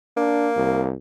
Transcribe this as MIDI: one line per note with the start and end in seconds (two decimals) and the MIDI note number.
0.17 0.86 58
0.17 0.49 62
0.56 0.94 36